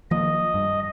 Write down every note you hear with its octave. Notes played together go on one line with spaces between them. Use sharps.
D#3 F3 A#3 D#5
G2